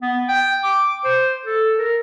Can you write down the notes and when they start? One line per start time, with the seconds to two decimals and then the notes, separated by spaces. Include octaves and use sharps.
0.02 B3
0.28 G5
0.64 D6
1.04 C5
1.45 A4
1.78 A#4